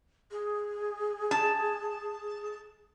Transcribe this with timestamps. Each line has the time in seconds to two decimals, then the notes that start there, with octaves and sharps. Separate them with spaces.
0.31 G#4
1.31 A5